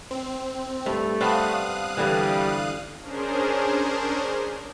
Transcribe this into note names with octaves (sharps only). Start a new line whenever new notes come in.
C4
G2 A3
B3 C4 D4 F5 D#6 F#6
D3 E3 G3
C#4 D4 G#4 A#4 C5